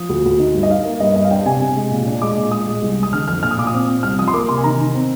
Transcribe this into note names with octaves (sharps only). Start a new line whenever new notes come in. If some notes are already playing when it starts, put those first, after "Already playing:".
Already playing: F3 D#6
D2
D2
D#4
G2
D#5
D#4 F5
A#3
G2 D#5
G2 D#5
F5
D4 G5
C3 G#5
C3 G#5
G#3
A#2
D4
G#3 D6
A#2
G#3 D#6
G#3
C2
G#3 D#6
D3 F6
F2 F6
A#2 F6
D#6
A#2 D6
D#6
C4
C4
C2 F6
F3 D#6
C6
A#3 D6
C3 C6
G#5
D#3 A#5
D#3
C4